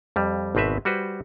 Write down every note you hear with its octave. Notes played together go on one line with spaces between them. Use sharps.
F2 G3
G#1 B2 C4 B4 E5
G3 F#4 B4 C5